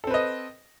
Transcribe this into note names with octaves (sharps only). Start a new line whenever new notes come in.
C4 A4 B4 D#5